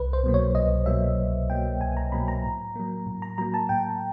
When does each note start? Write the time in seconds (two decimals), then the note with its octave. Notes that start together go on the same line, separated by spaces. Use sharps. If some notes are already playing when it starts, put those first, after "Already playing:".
Already playing: C2 B4
0.13 C5
0.23 B2 F#3 A#3
0.34 C#5
0.55 C2 D#5
0.86 B2 F#3 A#3 E5
1.18 C2
1.50 B2 F#3 A#3 G5
1.81 C2 G#5
1.97 A#5
2.12 B2 F#3 A#3 B5
2.28 A#5
2.44 A2
2.76 F#3 A#3
3.06 A2
3.22 A#5
3.38 F#3 A#3 A#5
3.54 A5
3.69 A2 G5